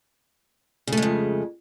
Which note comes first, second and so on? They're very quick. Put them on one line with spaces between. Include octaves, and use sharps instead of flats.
C#3 A3 G#3 F2